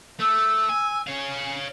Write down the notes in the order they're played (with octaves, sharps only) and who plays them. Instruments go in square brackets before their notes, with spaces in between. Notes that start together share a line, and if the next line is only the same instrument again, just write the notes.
[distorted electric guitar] A3 [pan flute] E6
[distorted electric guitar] G#5
[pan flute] C#4 [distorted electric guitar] C#5 F5